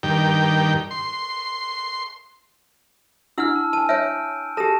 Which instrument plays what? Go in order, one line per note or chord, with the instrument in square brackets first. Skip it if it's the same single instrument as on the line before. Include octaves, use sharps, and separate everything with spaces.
[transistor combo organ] G2 D#3 G5
C6
[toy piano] D4 E4 F#5 [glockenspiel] E6 F6
[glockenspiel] A5
[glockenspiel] G#5 D#7 [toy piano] A5
[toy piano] C#5 E5 [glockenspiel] F6 G6 D7
[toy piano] G4 A4 [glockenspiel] A5 A#6 E7